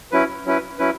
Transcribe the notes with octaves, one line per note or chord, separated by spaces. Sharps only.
F#3 C#4 E4 B4
F#3 C#4 E4 B4
F#3 C#4 E4 B4